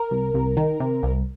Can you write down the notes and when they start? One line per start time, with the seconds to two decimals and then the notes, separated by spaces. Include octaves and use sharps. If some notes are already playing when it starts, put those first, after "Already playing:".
Already playing: A#4
0.11 C2
0.34 C2
0.57 D#3
0.80 C3
1.03 C2